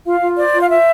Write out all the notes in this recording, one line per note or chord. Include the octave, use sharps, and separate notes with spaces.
F4 F5
F4
C5 D5
F4
F5
C5 E5